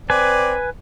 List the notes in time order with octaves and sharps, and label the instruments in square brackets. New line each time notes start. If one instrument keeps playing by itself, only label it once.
[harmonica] C4 D5 [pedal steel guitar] B4 G#5